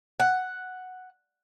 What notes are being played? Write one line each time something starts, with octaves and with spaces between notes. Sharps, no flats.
F#5